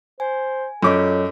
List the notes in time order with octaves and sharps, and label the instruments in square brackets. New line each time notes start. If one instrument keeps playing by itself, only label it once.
[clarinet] C5 [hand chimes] G#5
[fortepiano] F#2 D6 [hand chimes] F4 C#5 D#5 [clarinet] A4